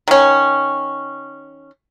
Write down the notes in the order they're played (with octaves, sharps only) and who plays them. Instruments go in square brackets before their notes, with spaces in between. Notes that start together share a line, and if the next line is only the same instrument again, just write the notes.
[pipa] D#3 C#4